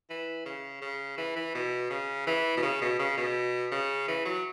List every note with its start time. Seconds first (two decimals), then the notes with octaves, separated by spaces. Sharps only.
0.10 E3
0.45 C#3
0.82 C#3
1.18 E3
1.36 E3
1.54 B2
1.90 C#3
2.27 E3
2.57 B2
2.62 C#3
2.82 B2
2.99 C#3
3.17 B2
3.72 C#3
4.08 E3
4.25 F#3